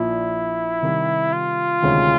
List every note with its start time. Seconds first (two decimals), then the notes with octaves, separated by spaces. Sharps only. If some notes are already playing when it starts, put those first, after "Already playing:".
Already playing: A#1 A#2 F3 E4
0.82 C3 D#3 G3
1.33 F4
1.82 D2 C3 D#3 G#3 C#4